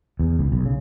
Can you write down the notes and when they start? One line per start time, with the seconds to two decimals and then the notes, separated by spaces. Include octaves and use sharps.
0.20 E2
0.39 C#2
0.52 B1
0.65 C#3